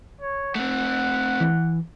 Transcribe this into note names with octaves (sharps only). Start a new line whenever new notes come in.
C#5
A3 C4 F#5
E3